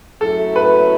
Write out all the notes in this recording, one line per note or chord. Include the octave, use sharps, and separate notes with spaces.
F#2 F#3 A3 E4 A4
B4